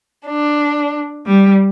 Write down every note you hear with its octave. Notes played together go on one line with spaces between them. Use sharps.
D4
G3